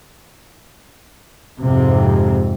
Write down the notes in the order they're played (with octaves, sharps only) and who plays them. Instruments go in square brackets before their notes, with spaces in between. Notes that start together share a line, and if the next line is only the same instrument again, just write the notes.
[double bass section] F2 G#2 C3